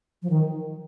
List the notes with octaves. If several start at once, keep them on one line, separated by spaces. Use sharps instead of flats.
F3
D#3